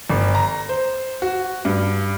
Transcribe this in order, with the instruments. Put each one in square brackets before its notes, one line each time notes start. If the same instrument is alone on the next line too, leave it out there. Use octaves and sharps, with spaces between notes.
[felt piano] G1
A#5
C5
F#4
G2